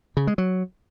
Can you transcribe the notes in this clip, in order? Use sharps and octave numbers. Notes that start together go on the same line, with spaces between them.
C#3
G#3
F#3